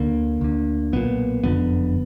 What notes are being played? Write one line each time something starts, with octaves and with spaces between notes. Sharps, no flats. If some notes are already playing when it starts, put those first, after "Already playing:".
Already playing: D2 D3 A#3
D2 D3
B1 A#2 B3
F#1 F2 D3 B3